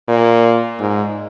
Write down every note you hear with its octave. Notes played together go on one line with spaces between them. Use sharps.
A#2
G#2